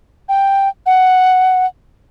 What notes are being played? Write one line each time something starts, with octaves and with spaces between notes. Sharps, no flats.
G5
F#5